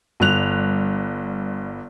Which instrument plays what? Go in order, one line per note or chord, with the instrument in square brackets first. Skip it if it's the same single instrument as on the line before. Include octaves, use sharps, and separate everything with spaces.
[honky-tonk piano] G1 G2 F#6 F7